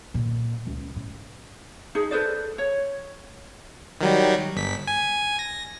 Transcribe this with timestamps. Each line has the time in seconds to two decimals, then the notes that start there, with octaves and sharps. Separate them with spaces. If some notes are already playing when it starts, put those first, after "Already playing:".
0.14 A#2
0.67 C#2
0.96 A2
1.95 D#4 G#4
2.11 A4 B4 C5 D5
2.58 C#5
4.01 D#3 F#3 G3
4.55 G1 B6
4.87 G#5
5.39 A#6